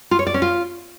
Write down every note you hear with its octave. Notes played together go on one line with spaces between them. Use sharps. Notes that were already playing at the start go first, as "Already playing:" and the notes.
F4
C#5
D5
C#4
F4